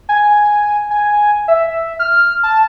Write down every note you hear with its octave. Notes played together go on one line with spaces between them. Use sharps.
G#5
G#5
E5
F6
A5